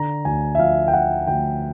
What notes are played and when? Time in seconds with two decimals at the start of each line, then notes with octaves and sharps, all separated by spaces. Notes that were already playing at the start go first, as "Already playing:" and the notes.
Already playing: D3 A#5
0.25 D2 G#5
0.55 E5
0.59 F3 F5
0.88 G5
0.93 F3 F#5
1.27 D2 G5